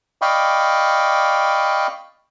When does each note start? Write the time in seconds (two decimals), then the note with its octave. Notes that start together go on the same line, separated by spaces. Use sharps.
0.22 D5 D#5 F5 G5 B5 C#6